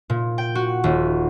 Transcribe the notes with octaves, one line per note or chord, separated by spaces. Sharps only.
A#2
G5
F#4
D#1